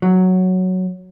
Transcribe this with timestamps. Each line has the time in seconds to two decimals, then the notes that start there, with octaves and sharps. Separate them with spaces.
0.02 F#3